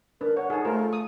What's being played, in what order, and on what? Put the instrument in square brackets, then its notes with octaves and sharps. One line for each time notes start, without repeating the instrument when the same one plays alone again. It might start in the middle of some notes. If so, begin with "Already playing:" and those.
[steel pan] D4 B4 [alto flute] A#4
[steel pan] C#5 [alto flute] F#5
[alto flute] D#4 [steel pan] G#4 A4
[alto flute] A3 [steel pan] F4 A#4 C5
[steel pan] D#6